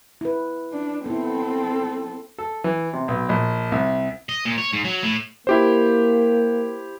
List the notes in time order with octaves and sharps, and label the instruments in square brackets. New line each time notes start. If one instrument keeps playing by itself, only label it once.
[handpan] E4 B4
[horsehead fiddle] D4
[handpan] B3 E4 [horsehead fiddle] C4 A4
[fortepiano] A4
E3
C3
B1
A#1
C2
[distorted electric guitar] D#5
A#2
C#5
G#2
F#3
A2
[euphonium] A#3 [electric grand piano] E4 G4 C5